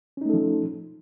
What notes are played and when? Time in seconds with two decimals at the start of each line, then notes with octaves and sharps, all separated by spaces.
0.17 C#4
0.21 D#4
0.25 A3
0.30 A4
0.34 F3